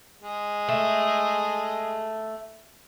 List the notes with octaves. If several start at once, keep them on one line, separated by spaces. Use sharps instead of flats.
G#3
A3